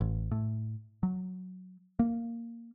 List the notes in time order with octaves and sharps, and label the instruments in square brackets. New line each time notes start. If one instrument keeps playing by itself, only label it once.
[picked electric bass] A1
A2
F#3
A#3